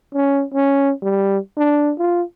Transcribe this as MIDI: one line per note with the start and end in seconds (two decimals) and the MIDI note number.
0.14 0.43 61
0.54 0.92 61
1.02 1.38 55
1.57 1.93 62
1.98 2.22 65